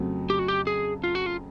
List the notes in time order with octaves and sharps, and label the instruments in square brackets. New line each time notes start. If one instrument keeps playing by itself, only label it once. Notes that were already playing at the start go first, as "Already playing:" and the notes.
Already playing: [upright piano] F2 C#3 F#3 A3 C4
[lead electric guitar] G4
F#4
G4
G#4
F4
F#4
F4